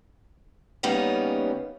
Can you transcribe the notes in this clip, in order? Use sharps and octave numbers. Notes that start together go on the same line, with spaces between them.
C#3 G3 A#3 B3 C#4 D#4